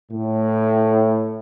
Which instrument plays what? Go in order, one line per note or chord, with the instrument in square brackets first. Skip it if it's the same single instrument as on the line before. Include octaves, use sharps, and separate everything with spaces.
[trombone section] A2